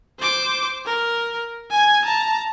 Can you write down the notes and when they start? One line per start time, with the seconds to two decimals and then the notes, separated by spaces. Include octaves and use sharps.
0.20 C5 D6
0.86 A#4
1.71 G#5 G#6
2.05 A5 A#5